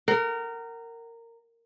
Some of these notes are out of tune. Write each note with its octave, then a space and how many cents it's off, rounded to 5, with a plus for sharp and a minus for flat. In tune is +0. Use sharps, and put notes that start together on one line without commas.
A#4 -15 F#5 +35